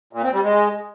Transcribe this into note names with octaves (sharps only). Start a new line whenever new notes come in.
A#2
C4
G3
G#3